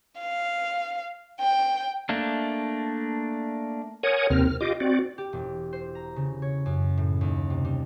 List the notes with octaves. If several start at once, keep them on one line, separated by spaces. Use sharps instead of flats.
F5
G5
A3 A#3 D4
A#4 C#5 F#5 G#5 D#6
D#2 C3 C4 A#4 F6
F6
F4 G4 D#5 D6
C4 F#4 D5
G4
E1
C5
A#5
C#3
C#5
F#2
A2
D#2
C3
G3